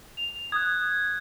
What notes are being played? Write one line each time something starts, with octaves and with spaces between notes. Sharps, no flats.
F7
D#6 F#6 G#6